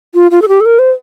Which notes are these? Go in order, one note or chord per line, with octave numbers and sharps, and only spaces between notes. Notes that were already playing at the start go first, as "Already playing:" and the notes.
F4
F4
A4
G4
A4
A#4
C5